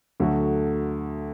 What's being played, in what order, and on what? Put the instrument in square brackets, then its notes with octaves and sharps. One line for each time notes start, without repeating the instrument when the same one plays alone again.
[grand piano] D2 D3 F#3 A3 F#4